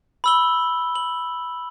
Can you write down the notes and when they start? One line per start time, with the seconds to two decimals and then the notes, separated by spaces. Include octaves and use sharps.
0.24 B5 E6 G7
0.95 F#7